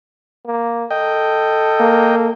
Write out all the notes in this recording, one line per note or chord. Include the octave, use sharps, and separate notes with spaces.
A#3
A4 D#5 G5
A#3